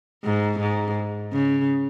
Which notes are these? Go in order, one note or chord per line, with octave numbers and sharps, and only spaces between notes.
G#2
G#2
C#3